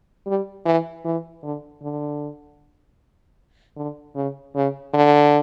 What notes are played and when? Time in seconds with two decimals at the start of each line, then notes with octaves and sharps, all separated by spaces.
0.27 G3
0.65 E3
1.05 E3
1.43 D3
1.82 D3
3.77 D3
4.15 C#3
4.55 C#3
4.94 D3